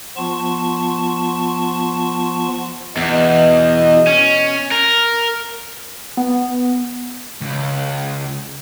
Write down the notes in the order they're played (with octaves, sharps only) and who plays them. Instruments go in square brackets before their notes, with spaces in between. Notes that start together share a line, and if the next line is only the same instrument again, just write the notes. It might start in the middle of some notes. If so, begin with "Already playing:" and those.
[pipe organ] F3 B3 F4 A5 C#6
[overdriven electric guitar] E2 [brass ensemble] B2 D#5
[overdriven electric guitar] C#4
A#4
[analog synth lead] B3
[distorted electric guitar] C#2